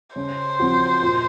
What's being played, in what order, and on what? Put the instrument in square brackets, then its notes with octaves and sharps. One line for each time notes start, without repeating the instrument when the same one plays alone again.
[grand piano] C#3 [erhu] C5
[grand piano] F3 C4 F#4
A#2